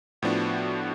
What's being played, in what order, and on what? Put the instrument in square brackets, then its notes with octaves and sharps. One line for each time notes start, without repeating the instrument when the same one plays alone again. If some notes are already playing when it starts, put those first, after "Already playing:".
[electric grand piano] A2 F3 B3 D4 [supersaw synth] F#4